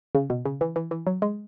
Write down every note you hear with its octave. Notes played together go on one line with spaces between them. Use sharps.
C#3
B2
C#3
E3
E3
E3
F#3
G#3